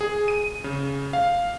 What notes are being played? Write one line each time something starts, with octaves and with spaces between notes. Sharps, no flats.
G#4
D#7
C#3
F5